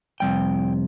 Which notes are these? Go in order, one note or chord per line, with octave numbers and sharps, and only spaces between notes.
F2 C3 G3 G5